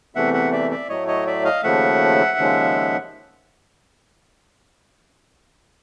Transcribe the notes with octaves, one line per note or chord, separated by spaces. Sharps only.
E2 C3 E3 A3 E5 F#5
E5 F#5
D5 E5
D5 E5
A2 F#3 A3 C#5 D#5
C#5 D#5
D5 E5
D#5 F5
D#2 C#3 F3 A3 E5 F#5
D#2 C#3 F3 G#3